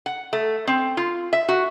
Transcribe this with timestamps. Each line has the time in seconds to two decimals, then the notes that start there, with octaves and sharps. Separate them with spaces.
0.06 F#5
0.33 A3
0.67 C4
0.97 F4
1.33 E5
1.49 F#4